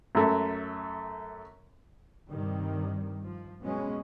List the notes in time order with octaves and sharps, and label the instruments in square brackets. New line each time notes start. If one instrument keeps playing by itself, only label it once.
[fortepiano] F#2 A3
[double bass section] G2 C3 D#3 G3
F3
B2 F#3 G#3 B3 C#4